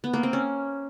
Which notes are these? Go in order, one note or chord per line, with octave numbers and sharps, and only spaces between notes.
B3
A#3
C4
C#4